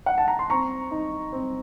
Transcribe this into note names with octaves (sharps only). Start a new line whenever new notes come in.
F#5
A5
A#5
C6
C4 A#5 C#6
D#4
C4